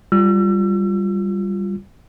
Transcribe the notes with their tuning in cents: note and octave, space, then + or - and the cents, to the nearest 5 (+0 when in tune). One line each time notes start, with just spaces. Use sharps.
G3 +0 F4 +0 E6 +35